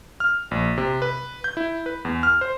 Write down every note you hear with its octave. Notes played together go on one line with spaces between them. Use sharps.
F6
A#1
C3
B4
G6
E4
B4
E2
F6
C5